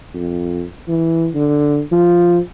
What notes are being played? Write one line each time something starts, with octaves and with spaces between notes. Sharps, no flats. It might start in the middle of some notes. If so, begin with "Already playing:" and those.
F2
E3
D3
F3